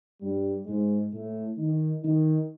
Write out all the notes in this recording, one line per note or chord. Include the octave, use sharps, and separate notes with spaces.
G2 G3
G#2 G#3
A2 A3
D#3 D#4
D#3 D#4